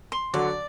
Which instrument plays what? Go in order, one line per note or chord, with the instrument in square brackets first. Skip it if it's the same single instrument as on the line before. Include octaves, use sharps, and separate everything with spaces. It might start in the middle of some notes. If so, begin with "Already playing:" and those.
[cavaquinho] C6
[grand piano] D3 F#3 [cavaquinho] D5